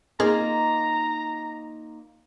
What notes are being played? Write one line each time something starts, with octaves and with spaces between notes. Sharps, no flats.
A#3 C4 D#4 F4 G#4 A#5 F6